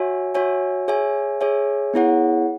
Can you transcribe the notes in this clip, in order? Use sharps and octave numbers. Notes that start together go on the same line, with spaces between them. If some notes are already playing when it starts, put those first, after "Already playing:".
Already playing: F#4 C#5 E5 G#5
F#4 C#5 E5 G#5
G#4 C#5 E5 G#5
G#4 C#5 E5 G#5
B3 E4 G#4 C#5 F#5